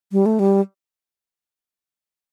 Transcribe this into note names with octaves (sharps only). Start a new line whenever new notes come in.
G3
A3
G3